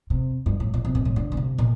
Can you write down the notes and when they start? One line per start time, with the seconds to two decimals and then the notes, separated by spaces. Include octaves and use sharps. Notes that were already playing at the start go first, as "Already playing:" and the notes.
0.10 C3
0.46 G2
0.60 A2
0.74 A#2
0.85 C3
0.95 A#2
1.05 A2
1.16 D3
1.32 A#2
1.37 C3
1.58 A#2